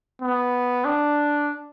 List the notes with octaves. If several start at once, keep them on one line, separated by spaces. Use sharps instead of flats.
B3
D4